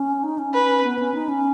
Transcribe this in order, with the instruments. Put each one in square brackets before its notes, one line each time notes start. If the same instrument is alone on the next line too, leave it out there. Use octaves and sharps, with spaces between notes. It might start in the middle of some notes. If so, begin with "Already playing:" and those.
Already playing: [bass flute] C#4
D#4
C#4
[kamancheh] B4
[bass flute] B3
C#4
D#4
C#4